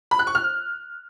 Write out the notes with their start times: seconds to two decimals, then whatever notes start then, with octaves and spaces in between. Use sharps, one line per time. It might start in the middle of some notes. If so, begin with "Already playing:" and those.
0.11 B5
0.19 F#6
0.27 C#6
0.35 F6